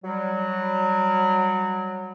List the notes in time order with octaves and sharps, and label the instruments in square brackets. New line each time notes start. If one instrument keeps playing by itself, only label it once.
[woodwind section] F#3 G3